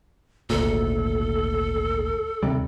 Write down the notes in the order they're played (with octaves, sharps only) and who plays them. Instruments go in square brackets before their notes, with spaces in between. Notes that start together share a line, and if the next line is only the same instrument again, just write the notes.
[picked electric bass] G#1 D2 A#2 [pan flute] A4
[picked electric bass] D#2 C3 G3